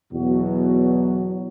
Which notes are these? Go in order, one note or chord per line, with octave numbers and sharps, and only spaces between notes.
E2 B2 F#3 F#4